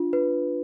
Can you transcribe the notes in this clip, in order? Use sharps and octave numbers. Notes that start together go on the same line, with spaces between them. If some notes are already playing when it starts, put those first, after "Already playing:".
Already playing: D4 F4
B4